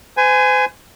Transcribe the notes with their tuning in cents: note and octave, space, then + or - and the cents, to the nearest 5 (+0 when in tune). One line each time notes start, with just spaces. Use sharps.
C5 -45 G#5 +0